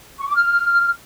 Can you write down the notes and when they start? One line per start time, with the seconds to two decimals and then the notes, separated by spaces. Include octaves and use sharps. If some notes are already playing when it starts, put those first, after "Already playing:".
0.19 C#6
0.27 D6
0.35 F6